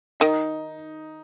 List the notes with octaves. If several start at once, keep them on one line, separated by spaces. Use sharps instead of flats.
D#3 D#4